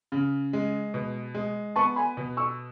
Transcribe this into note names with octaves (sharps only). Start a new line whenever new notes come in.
C#3
G#3
B2
G#3
B3 A5 C#6
G#5 B5
B2
C#6 E6